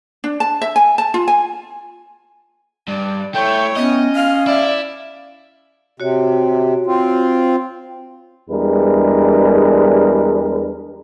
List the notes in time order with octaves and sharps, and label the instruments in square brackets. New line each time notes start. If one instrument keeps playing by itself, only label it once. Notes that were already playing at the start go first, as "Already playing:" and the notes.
[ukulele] D4
A5
E5
G#5
A5
F4
G#5
[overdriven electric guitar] G2 [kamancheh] D5
[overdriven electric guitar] A3 [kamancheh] E4 C#5 [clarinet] G5
[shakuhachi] B3 [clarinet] C#4 [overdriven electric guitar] D#5
[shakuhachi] F5 [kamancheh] F6
[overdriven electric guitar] E4 [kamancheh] D5 E5
[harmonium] C3 [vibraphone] F#4 C#5
[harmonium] C4 F4
[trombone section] E2 G3 G#3 D4 A#4 B4